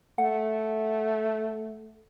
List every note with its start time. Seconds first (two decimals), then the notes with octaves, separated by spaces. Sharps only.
0.18 A3 F#5